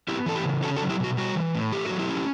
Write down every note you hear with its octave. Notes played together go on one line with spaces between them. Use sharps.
B3 E4 G4
E3 A4
E4 G4
C#3
C#4 F#4 A4
F#4 A4
F#3
E4 G4
B2 F#4
G3 F#4
E3
A2
A3 G4
F#3 F#4
E4 G4
C#4